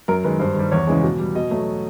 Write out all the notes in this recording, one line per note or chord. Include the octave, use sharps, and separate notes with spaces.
F#2 A#4
D#3 G#3 B4
G2 C5
D#3 G3
E2 C#5
C#3 E3 G#3
B2
G3
B2 D#5
F#3 A3